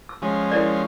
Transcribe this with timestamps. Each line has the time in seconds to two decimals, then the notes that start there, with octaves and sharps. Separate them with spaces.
0.09 E6
0.22 F3 G#3 C#4
0.51 E4 A#4 D5